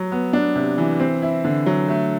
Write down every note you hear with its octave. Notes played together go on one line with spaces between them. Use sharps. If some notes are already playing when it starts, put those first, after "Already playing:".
Already playing: F#3
B3
D4
C3
E3
C4
E4
D3
F#3
A3